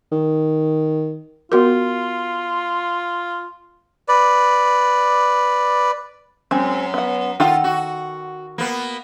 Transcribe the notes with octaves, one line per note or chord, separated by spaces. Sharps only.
D#3
B3 F4 F#4 A#4
B4 D5
F#2 G#3 C4
B3 F#5
D#3 F4 A4 F#5
F#4
A#3 B3